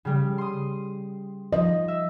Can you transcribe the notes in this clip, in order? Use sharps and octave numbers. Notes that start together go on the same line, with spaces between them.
C#3 G3
C6 D#6
F3 D#5
E5